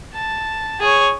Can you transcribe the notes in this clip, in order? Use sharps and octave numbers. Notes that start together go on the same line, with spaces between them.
A5
G#4 C#5